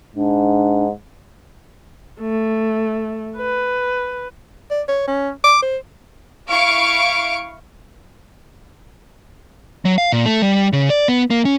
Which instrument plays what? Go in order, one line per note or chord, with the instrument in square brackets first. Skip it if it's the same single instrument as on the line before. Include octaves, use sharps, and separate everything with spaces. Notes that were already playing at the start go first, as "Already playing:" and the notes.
[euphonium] G#2 [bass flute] D4
[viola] A3
B4
[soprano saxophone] D5
C#5
C#4
D6
C5
[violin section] E4 F5 C#6 D7
[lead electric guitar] F#3
F5
A#2
A3
G3
C#3
D5
B3
A#3
C#4